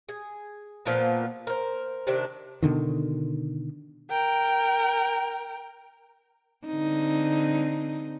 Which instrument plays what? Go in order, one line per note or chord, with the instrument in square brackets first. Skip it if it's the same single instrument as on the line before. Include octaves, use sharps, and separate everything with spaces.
[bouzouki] G#4
A#2 F3 A#3 B3
A#4 C5
C3 D#3 D4
[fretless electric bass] B2 D3 D#3
[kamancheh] A#4 G5
[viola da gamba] D3 C4 D#4